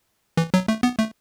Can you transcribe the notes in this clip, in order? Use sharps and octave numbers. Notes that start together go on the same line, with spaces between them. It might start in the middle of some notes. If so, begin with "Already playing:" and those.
E3
F#3
A3
B3
A3